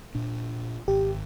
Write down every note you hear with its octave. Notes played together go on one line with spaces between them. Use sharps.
A#2 D4
G#1 G4